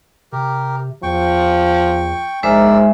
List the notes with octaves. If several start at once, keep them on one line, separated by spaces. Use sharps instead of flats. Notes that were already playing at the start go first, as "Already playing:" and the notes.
C3 G4 A#4
E2 F3 G5 C#6
A#1 G#2 G#3 A#4 C5 D5 E5 E6